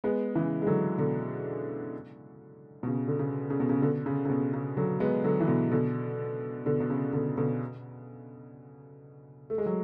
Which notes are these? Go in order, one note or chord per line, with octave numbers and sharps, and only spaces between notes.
G#3 B3
C#3 E3
G#3
D3 F#3
B2 D3
B2
C#3
D3
C#3
C#3
B2
C#3
B2 D3
C#3
C#3
B2
C#3
D3 F#3
G#3 B3
D3 F#3
E3
B2 D3
B2 D3
B2 D3
B2
C#3
B2 D3
B2 D3
A3
G#3
F#3